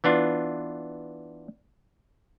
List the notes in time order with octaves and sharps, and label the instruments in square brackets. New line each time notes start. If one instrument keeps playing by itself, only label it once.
[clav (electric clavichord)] E3 B3 D4 F4